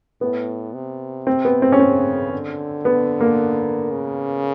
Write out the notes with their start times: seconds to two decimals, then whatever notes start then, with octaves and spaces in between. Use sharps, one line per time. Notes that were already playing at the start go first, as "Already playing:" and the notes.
0.21 A2 B3
0.74 C3
1.27 C4
1.45 B3
1.62 C4
1.72 C#4
1.79 C#3 C4
2.33 D3
2.85 B3
3.21 A#3
3.91 C#3